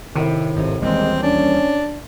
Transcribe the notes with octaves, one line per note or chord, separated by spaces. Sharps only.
F2 A2 C3 D#3
G#1 G#2 C3
D#1 E3 G3 G#3 C4
C#4 D4